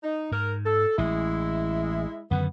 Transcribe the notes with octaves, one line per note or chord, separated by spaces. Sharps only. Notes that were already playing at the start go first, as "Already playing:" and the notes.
D#4
G#2 A#4
A4
A1 G#3 E4
F#2 D3 D#3 B3